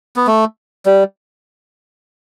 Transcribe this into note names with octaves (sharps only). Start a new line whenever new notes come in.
B3
A3
G3